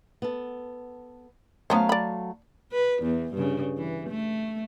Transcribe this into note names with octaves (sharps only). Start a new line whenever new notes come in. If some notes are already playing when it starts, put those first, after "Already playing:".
B3 A4
F#3 A3 B3 C#4 C5 F5
D5 B5
B4
E2
G2 C#3
E3
A3